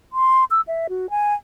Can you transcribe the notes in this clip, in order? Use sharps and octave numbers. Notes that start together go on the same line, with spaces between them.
C6
E6
E5
F#4
G#5